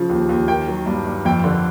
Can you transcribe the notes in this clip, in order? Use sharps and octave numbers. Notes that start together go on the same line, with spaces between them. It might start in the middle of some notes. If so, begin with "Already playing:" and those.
Already playing: C#3 F3
D#2
D#2
D#3 G5
F#3
G2
G2
F2 G5
D3